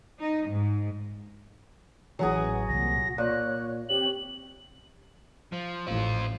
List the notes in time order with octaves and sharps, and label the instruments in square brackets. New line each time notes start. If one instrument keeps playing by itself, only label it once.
[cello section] D#4
G#2
[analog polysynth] A1 E3 [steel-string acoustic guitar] F#3 F#4 G#4 [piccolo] G#5
[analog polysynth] C2 A#2 [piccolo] A#6
[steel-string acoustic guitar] A#2 [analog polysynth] C#5 [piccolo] F#6
[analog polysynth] C4 G4 C#5 [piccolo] F#7
[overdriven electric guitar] F3
[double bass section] A1 [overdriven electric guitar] C4 F4